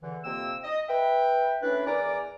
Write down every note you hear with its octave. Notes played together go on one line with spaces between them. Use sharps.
E2 D3 E3
F2 C3 A#3 G5 E6
D#5
B4 E5 G5
A3 C#4 D4 E4 B4
E2 A#4 D5 G#5 A#5 D6